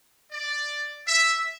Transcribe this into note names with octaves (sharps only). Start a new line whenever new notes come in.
D5
E5